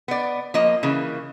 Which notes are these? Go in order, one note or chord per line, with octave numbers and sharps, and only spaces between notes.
B3 D5
F3 A#3 D#5
C#3 E3 A#3